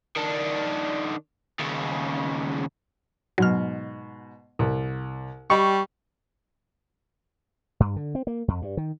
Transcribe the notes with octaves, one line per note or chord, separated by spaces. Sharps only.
D#3 D4
D#2 C#3
G#2 B2 F#3 F6
C2
G3 D#5 G5 B5 C#6
G2
D3
C4
A#3
F2
G2
D#3